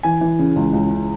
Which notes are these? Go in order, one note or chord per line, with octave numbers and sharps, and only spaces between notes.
E3 G#5
E3
C#3
C#2
C#2
C#3